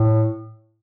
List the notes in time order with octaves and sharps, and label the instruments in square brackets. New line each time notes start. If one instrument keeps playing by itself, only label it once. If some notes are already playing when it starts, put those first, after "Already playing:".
Already playing: [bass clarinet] A2